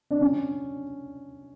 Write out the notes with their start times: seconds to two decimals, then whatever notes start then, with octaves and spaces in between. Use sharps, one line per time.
0.11 D4
0.21 C#4